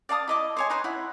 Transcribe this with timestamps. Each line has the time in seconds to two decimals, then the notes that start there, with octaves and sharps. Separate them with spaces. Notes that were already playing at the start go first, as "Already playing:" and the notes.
0.09 D5 F5 A5 D#6
0.28 E4 D#5 D6
0.57 C5 C#5 G#5
0.70 D#4 B4 C5
0.84 E4 F#5